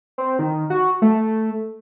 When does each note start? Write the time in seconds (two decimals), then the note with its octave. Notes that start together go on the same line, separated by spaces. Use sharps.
0.18 C4
0.39 D#3
0.70 F#4
1.02 A3